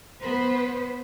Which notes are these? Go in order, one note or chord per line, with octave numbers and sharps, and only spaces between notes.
B3 B4 C5